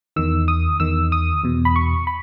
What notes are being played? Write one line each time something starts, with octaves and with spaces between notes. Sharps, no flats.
E2 D#3 E6
D#6
E2 D#3 E6
D#6
E2 B2
B5
C#6
B5